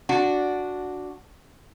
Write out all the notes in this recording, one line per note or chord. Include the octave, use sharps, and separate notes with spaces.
D4 F#4